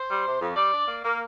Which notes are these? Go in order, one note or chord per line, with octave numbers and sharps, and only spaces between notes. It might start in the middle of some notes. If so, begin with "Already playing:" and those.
Already playing: C5
G3
C3
F2
G3 D5
D4
A#3
A#3